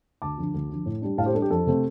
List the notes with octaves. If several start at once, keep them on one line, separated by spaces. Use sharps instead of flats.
D2 A5 D6
D3 F3
D2
D3 F3
A2
G3 D4
A2 F5 A5
G4 C5
G3 D4 A4
G4
F2 A4
C3 A3 C4